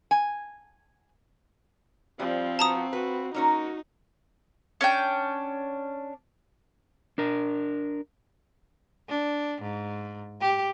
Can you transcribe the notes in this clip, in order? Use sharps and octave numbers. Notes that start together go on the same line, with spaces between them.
G#5
F3 G3 C4
B3 F#4 A5 A#5 D#6
F#4 B4
A#3 C#4 D#4 F#4 A#4
C#4 D4 G5
D4 A#4
D4
G#2
G4